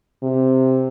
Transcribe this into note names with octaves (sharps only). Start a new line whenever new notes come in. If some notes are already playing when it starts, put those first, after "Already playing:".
C3